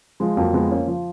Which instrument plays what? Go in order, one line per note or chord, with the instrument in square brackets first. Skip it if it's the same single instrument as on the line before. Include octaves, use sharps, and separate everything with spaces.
[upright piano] F3 G#3
F2 F#3 A#3
F3 G#3 B3
F3 A#3 C#4
F3